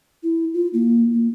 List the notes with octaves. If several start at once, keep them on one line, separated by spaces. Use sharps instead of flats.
E4
F4
A#3
A#3